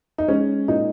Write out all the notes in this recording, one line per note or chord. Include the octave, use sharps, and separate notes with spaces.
D#4
G#3 C#4
A#2 D#4